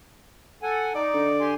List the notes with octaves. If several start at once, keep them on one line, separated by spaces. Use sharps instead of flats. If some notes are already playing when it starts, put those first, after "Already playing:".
A4 F#5 G#5
D#4 D5
D3
G4 G#5 C6